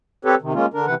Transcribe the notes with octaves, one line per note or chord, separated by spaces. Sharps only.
C4 G4 A4 B4 C#5
C3 D#3
G#3 A#3 C#4 F4
D3 D4 A#4
C3 E3 B4 F#5